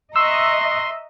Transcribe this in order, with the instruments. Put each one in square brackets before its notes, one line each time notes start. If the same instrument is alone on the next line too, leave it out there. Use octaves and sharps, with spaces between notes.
[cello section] D#5 E5 [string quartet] A#5 C#6 F#6 [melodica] C6 [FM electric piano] E6